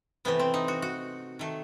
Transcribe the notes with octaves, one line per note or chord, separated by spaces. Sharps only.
C3 E3 A3 B3
C4
D#4
F#4
F#4
D#3 A3